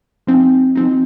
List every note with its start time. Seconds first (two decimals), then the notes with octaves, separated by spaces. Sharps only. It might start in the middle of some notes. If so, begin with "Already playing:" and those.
0.27 F3 C4 D#4
0.75 F3 C4 D#4